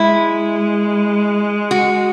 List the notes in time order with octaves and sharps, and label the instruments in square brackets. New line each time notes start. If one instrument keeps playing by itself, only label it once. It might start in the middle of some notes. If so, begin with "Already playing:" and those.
Already playing: [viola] G#3 [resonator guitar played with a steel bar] E4
[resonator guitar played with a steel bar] F#4